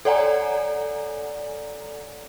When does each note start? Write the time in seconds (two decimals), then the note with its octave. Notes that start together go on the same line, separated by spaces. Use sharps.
0.05 A4 C#5 D5 F#5 G#5 A#5